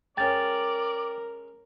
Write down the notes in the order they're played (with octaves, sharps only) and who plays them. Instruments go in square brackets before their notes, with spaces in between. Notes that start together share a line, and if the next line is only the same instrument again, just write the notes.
[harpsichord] G#3 C#4 [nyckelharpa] A#4 [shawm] D5 [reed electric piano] G5 A6